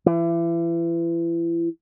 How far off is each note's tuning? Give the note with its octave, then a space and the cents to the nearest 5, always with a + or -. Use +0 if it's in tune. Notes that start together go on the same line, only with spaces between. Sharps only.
E3 +30